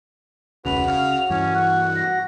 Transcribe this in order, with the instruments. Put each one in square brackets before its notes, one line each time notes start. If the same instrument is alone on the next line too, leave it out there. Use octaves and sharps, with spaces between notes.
[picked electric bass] E1 C#2 C#3 [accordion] F#4 [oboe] B4 [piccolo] F7
[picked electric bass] C#3 [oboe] F5
[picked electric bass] G2 E3 [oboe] C#4
[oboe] F#5 [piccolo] C#6
[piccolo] A#6